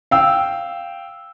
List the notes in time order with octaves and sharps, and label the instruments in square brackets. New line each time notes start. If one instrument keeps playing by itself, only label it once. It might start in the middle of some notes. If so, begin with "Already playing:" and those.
[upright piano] F5 G5 E6